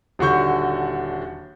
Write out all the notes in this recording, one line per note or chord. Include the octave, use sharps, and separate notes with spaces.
D#1 D3 F#4 C#6 G6